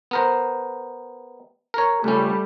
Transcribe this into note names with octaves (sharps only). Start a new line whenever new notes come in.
B3 A#4 C5
A#4 C#5
C#2 G3 A3 C#4